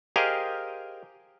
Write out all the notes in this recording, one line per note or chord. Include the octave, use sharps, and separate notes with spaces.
G4 G#4 A#4 C5 D#5 F5